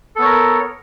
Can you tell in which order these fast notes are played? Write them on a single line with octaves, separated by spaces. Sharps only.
A4 B3 C#5 A#4